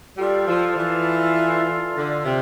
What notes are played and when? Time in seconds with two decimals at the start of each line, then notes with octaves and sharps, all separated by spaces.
0.17 G3 F4 A4 D5
0.47 F3
0.77 E3
1.96 D3
2.25 C3